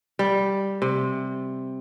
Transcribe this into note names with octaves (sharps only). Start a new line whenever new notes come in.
G3
C3